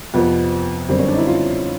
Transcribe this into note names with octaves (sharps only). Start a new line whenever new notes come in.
F2 C3 F3 B3
F#2 D3 G3 C4
C#4
D4
D#4
E4
F4